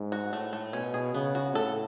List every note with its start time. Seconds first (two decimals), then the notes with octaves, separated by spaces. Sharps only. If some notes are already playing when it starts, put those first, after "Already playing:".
Already playing: G#2
0.12 F#4
0.33 A2 A3
0.53 A3
0.73 B2 C#4
0.94 G#4
1.14 C#3 B3
1.35 F#4
1.54 A2 A4